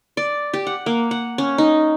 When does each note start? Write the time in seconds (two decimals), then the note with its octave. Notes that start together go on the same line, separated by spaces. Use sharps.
0.17 D5
0.54 G4
0.67 F#5
0.86 A#3
1.11 F#5
1.38 C#4
1.58 D#4